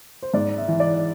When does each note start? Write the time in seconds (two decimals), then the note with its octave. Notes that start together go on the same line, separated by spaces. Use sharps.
0.23 C5
0.34 G#2 D5
0.57 E5
0.68 E3
0.80 D5